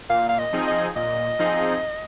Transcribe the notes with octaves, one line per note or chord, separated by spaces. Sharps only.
A#2 F5
F5
D#5
F3 C4 D#4 G#4
D#5
A#2 D#5
F3 C4 D#4 G#4